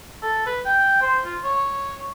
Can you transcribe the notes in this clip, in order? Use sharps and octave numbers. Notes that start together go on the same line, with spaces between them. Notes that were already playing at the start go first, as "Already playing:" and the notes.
A4
B4
G5
C5
F4
C#5